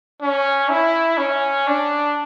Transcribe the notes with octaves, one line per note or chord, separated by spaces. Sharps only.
C#4
E4
C#4
D4